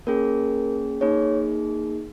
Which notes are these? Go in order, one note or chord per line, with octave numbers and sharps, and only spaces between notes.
A#3 C#4 G#4 A#4
A#3 D#4 G#4 C#5